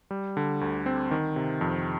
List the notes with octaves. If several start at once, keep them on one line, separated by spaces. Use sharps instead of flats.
G3
D3
D2
C4
D#3
C3
F2